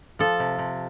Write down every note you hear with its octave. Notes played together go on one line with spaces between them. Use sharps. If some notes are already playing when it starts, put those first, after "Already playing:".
F3 A4
C3
C3